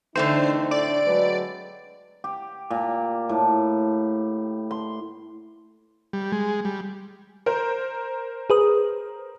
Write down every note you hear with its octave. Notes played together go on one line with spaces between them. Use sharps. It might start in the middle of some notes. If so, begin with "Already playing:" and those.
D3 E3 A3 C4 D4 D#4 C5
A2 D4 D5
F#3 G#3 B4
G4
A#2
A2
C6
G3
G#3
G3
A#4 C5
G#4 B4 D#6